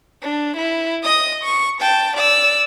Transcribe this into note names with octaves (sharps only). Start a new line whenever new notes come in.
D4
E4
D#5 D#6
C#6
G5 A5
D5 E6